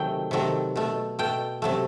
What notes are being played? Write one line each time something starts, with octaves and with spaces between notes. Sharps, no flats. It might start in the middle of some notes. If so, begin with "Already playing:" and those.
Already playing: C3 D#3 F#3 A3 G5
C3 D#3 F#3 A3
B2 A3
B2 A3 G5
C3 F#3 A3